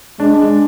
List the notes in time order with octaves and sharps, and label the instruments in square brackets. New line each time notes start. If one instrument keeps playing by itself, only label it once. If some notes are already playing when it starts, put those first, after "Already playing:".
[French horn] G#3 [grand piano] D4